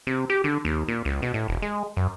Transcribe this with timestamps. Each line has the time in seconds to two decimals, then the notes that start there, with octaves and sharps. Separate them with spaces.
0.07 C3
0.30 G4
0.44 D3
0.65 D#2
0.88 A#2
1.05 C#2
1.22 B2
1.34 A2
1.48 E1
1.62 G#3
1.97 F#2